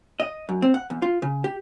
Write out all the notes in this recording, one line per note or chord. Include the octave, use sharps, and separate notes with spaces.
D#5
F#2
C4
F#5
E2
F4
C#3
G4